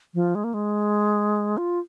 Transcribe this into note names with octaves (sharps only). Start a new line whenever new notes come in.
F3
G#3
A#3
G#3
F4